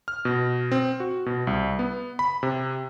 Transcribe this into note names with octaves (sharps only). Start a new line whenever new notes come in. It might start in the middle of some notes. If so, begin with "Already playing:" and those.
F6
B2
C4
F#4
B2
C2
B3
B5
C3